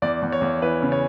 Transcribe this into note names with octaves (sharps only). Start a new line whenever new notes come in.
E2 D5
E2
C#5
E2
E3 B4
C#3
C#5